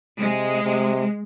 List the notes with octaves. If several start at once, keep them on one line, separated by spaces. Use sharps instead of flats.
C3 G#3
C3